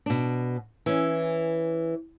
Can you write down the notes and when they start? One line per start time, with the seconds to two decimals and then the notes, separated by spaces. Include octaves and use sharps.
0.06 B2 D4
0.86 E3 C#4